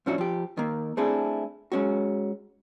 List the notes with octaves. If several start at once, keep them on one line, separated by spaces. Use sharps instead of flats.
A2 F3 C#4 D4 E4 F#4
F3 G4
D#3 A#3
A3 C4 D4 E4 G#4 A4
G#3 C#4 F#4